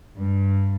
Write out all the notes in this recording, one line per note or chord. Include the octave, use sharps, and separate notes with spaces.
G2